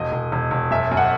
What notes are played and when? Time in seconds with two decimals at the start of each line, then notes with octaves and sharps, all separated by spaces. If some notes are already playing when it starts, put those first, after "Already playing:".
Already playing: E1 D#5
0.12 E1
0.32 E1
0.51 E1
0.71 F#2 E5
0.91 F#2
0.97 F#5